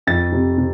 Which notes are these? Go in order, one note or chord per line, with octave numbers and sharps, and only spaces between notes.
F2 A6
C3
C3